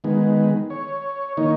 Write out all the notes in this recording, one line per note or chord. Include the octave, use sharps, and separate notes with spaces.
D#3 G#3 B3
C#5
D#3 A#3 D#4 C#5